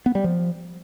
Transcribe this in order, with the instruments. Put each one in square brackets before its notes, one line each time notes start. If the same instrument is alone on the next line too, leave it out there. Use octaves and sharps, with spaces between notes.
[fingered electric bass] B3
G3
F3